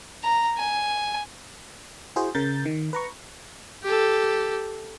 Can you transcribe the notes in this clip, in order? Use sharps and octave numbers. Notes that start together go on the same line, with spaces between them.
A#5
G#5
E4 F#4 G#4 C5
C#3 A#4 G6 A6
D#3
B4 A#5 C#6
G4 A4